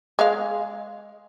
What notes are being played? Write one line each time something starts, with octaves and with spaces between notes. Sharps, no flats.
G#3 F5